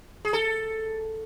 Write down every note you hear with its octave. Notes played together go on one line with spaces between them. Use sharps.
G#4
A4